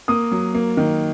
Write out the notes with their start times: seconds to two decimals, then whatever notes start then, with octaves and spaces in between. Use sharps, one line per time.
0.08 A#3 D#6
0.32 F#3
0.54 A#3
0.77 D#3